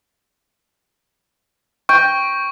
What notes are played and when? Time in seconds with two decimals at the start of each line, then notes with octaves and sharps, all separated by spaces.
1.89 G5 C#6